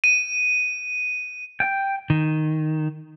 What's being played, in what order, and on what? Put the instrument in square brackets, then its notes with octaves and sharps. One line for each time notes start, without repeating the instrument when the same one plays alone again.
[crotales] D#7
[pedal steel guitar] G5
[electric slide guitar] D#3